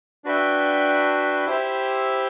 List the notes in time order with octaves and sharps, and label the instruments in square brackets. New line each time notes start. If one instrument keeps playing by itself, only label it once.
[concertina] D4 F#4 B4 E5 G5
E4 G4 C5 E5